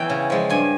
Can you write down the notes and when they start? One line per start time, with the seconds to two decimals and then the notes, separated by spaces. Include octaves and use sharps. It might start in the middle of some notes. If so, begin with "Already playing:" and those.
Already playing: E2 E3 C#4 G5
0.10 C#3
0.30 F3 G#3
0.50 G2 G#5